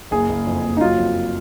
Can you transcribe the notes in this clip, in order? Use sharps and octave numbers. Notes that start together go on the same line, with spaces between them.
F#1 G#4
F#1
F2
F#1
D#4
F#3 F4
F2